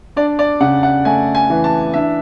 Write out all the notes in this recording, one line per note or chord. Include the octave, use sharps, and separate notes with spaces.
D4 D5
D5
C#3 F#5
F#5
A3 G#5
G#5
E3
A5
D4 E5